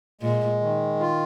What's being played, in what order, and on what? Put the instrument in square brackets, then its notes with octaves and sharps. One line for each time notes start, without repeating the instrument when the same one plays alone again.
[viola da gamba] A#2 [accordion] G#3
[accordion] D#3
F4